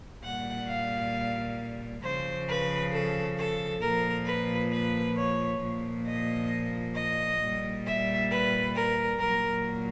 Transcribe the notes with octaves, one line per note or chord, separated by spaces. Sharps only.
A#2 G3 F#5
F5
C#3 F3 C5
B4
A4
A4
A#2 F3 A#4
B4
B4
C#5
A#2 F3
D#5
D#5
A#2 G3
E5
B4
A#4
A#2 F#3 A#4